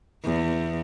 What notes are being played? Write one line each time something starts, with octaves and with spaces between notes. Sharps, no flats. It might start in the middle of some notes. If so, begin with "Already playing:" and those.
E2